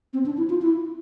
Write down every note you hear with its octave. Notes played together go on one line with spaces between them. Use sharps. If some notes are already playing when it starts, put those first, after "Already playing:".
C4
D4
E4
F4
E4